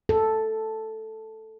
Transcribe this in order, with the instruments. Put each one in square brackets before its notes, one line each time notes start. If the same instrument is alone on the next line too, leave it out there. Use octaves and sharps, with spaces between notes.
[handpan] A4